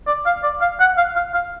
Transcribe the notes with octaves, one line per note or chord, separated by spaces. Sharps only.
D5
F5
D5
F5
F#5
F5
F5
F5